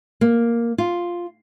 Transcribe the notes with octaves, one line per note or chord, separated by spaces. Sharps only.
A#3
F4